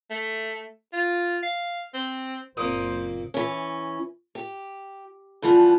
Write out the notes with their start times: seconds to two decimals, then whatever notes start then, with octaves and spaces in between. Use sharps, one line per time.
0.10 A3
0.93 F4
1.43 F5
1.94 C4
2.57 F#1 A#2 A#3 C4 C5 D#6
3.34 E3 C#4
4.35 G4
5.42 G2 E3 F3 B3 D4